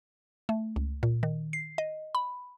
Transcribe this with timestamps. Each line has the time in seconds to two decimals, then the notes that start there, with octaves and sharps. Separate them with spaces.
0.49 A3
0.76 C#2
1.03 A#2
1.23 D#3
1.53 C7
1.78 D#5
2.15 B5